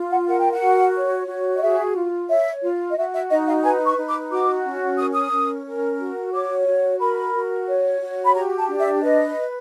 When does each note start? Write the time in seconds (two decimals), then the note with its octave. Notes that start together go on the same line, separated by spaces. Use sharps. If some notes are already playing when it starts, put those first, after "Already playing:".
Already playing: F4
0.10 F#5
0.27 A#4 F#5
0.39 G5
0.51 F#5
0.61 F#4
0.95 C#5
1.28 F#4
1.56 D#5
1.62 G#4 E5
1.95 F4
2.29 C#5 E5
2.63 F4
2.90 D#5
2.97 F#4 E5
3.13 E5
3.30 D#4 D#5
3.47 F5
3.63 B4 G#5
3.87 C#6
3.97 D#4
4.08 D6
4.31 F#4 D6
4.65 C#4
4.98 A#4 D#6
5.13 D#6
5.32 C#4
5.66 A#4
5.99 F#4
6.33 C#5 D6
6.67 F#4
7.00 A#4 B5
7.33 F#4
7.67 C#5
8.01 F#4
8.26 B5
8.34 G4 A#5
8.57 A5
8.68 D4
8.80 E5
9.02 B4 D#5